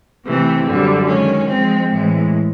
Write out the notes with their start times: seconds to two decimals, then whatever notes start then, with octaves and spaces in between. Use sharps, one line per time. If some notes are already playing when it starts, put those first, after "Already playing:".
0.25 C3 E3 A3 C4
0.65 F#2 D3 G3
1.06 D#3 G#3 C#4
1.47 F3 G#3 C4
1.89 A2 E3 G#3